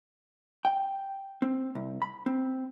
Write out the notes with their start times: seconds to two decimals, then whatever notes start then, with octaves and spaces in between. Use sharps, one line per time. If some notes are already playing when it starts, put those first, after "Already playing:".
0.65 G5
1.42 C4
1.75 C2
2.02 B5
2.26 C4